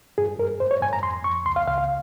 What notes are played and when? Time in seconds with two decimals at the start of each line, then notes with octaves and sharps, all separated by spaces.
0.18 G2 G#4
0.39 G2 A#4
0.60 G2 C5
0.71 C#5
0.82 G2 G#5
0.93 A#5
1.03 F2 C6
1.24 F2 C#6
1.46 C#2 C6
1.56 F5
1.67 C#2 F5
1.78 F5